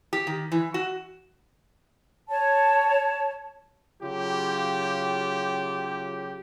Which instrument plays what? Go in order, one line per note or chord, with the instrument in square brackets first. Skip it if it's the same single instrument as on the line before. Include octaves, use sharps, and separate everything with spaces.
[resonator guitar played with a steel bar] G4
D#3
E3
F#4
[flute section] C#5 A5
[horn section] C#3 F#3 F4 G4